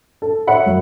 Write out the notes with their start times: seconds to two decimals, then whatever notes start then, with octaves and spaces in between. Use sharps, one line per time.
0.22 A4
0.47 C#5 E5 F#5 B5
0.66 F#2